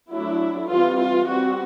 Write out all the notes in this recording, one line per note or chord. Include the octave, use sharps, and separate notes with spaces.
F#3 A3 D4 E4
E3 G3 C4 F4
F4
G3 C4 F#4